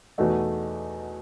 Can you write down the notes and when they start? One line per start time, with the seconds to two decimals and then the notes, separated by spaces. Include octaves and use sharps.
0.18 E2 B2 A3 D#4 F#4